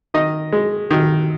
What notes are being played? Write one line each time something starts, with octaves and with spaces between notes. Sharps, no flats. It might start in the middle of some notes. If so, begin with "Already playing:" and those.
D#3 D#5
G#3
D#3